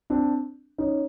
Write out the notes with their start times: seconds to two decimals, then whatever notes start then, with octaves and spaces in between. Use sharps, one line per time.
0.10 C4 D4
0.78 C#4 D#4